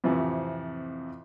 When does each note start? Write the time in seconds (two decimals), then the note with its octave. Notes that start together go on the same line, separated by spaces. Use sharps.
0.04 F2 A2 C3 E3